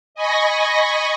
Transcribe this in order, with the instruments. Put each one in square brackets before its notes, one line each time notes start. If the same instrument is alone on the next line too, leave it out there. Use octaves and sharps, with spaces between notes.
[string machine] D#5 G#5 B5 C#6 A#6